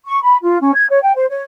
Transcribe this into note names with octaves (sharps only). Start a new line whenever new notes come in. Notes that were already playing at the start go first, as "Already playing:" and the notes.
C#6
B5
F4
C#4
G#6
C#5
G5
C5
C#5